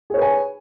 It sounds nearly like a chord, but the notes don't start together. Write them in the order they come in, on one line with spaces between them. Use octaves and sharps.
G#4 C#5 B4 G#5